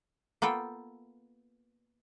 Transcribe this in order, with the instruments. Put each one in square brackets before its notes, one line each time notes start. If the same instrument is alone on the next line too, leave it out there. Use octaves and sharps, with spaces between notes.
[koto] A#3 B3 F4 A4 G5